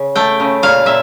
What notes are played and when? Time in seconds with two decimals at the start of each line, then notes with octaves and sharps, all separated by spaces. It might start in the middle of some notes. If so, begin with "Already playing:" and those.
Already playing: C#3
0.16 A3 G5
0.40 C#3
0.63 A#2 F5
0.86 A#2 E5